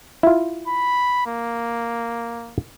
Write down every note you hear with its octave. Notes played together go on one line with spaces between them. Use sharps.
E4 F4
B5
A#3